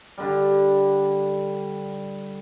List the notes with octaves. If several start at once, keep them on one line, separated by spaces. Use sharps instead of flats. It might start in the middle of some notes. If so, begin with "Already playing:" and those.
D3 G3